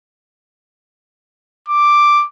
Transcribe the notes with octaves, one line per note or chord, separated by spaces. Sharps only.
D6